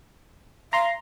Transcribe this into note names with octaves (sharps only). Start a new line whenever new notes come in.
F5 A#5 C6